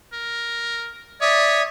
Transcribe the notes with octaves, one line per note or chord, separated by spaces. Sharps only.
A#4
C#5 D5 E5 D#6